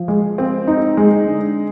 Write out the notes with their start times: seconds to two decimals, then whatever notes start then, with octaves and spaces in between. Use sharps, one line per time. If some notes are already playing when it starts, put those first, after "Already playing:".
Already playing: F3
0.08 G#3
0.38 C4
0.67 D#4
0.97 G#3
1.27 D3